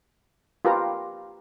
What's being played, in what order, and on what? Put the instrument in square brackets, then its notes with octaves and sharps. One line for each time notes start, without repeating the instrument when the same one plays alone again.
[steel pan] F4 G4 A#4 B4 A#5